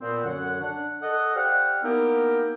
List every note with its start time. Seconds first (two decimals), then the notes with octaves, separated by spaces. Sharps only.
0.01 A#2 B3 C4
0.24 F#2 D3 C#5 F#5
0.60 D4 F#5
1.02 A4 D#5 F#5
1.36 G4 C5 D5 F5 F#5
1.83 A#3 B3 D#4 E4 G4 A#4